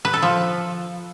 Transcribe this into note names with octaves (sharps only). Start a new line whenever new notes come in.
B4
A4
F3